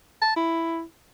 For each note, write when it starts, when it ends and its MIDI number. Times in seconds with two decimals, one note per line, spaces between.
0.22 0.35 81
0.36 0.82 64